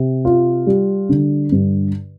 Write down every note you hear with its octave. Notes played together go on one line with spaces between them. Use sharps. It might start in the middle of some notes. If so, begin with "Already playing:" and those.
Already playing: C3
F4
G3
D3
G2